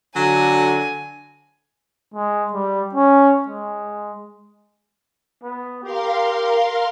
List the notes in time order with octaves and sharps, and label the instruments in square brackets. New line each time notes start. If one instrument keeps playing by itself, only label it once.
[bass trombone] D3 [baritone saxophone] F#3 [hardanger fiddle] G#5
[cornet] G#3
G3
C#4
G#3
[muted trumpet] B3
[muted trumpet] G4 [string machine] A#4 F5 C6